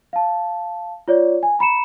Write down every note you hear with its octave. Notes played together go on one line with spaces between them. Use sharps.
F5 A5
F4 C#5 D5
G#5
A#5 B5 C#7 E7